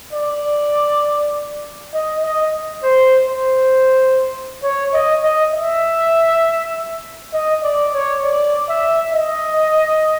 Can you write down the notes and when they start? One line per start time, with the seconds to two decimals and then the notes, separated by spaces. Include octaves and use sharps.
0.13 D5
1.93 D#5
2.23 D#5
2.83 C5
3.28 C5
4.63 C#5
4.93 D#5
5.23 D#5
5.53 E5
7.33 D#5
7.63 D5
7.94 C#5
8.23 D5
8.69 E5
9.13 D#5